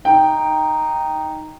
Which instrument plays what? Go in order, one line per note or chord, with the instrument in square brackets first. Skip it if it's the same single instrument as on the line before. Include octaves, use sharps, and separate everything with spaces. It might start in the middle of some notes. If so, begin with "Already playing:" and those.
[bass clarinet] D#4 [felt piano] G5